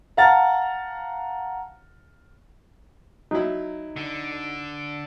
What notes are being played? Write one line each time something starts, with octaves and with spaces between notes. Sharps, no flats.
F5 F#5 A5 A#5 F6 A6
F#3 D#4 E4
D3